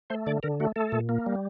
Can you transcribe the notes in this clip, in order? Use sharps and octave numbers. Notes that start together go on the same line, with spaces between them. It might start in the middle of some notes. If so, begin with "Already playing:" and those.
A3 C5
D3 D5
D3 A#4
A3 F#4
A3 A4
A#2
A#3
G3